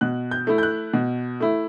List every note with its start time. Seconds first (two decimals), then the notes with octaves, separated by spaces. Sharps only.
0.01 B2 F#6
0.31 G6
0.47 A3 E4
0.58 G6
0.63 F#6
0.93 B2
1.40 A3 E4